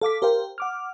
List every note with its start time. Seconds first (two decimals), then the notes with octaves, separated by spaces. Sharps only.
0.02 A4 F5 D6 B6
0.22 G4 A#4 C5 F5 G5
0.58 F#5 D6 F6